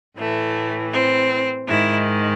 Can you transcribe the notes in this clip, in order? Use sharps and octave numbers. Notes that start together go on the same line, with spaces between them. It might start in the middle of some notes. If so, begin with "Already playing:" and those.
A2 E3 A3
C4
G#2 D#3 E4